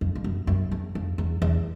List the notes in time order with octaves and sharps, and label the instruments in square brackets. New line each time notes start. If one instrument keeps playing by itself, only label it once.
[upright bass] F2
F2
F#2
F#2
E2
F2
E2
E2